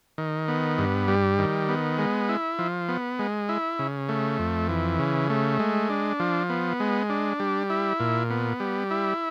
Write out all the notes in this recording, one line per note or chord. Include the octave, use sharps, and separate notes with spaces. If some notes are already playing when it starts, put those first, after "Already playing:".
D#3
B3
G2
G3
D#3
B3
G#3
E4
F3
B3
G#3
E4
C#3
A3
F2
E3
C#3
A3
G#3
D4
F3
B3
G#3
D4
G3
E4
A#2
B3
G3
E4